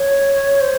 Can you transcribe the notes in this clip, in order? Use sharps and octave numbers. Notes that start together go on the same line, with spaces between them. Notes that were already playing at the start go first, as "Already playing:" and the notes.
Already playing: C#5
C5